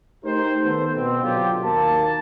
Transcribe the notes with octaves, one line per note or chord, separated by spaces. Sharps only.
A3 D#4 G4 A#4 C5
D#3 A3 B3 A4 C5
B2 C4
B2 D3 F#3 F4 G4
D#2 A#3 A5